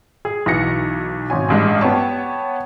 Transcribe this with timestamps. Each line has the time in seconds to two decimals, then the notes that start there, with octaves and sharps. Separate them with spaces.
0.25 G#4
0.46 B1 E3 A#6 C#7
1.30 G#1 C#4 G#5
1.49 A1 G2 G#3
1.81 B3 G4 C#5 A5